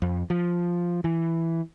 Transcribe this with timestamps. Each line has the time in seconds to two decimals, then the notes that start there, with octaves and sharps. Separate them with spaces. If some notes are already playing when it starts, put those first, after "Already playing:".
0.02 F2
0.30 F3
1.04 E3